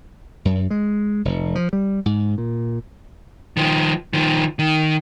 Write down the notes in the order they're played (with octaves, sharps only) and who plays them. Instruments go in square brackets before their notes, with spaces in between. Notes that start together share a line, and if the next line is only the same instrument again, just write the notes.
[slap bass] F#2
G#3
F1
F3
G3
G#2
A#2
[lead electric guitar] D#3 F3
D#3 F3
D#3